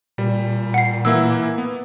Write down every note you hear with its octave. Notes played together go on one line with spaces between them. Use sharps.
A#2 G3
F#5 C7
E3 A#3 E4 E6
B3